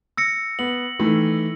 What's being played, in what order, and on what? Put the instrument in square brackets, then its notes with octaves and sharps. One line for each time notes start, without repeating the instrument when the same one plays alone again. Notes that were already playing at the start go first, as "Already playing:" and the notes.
[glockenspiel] E6 A#6 C#7
[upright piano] B3 [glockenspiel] F#7
[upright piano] D#3 E3 A3